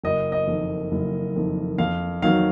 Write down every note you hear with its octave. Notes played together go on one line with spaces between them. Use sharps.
F#1 D#5
D#5
F2 D#3
F#1
F2 D#3
F2 F5
D#3 F#3 F5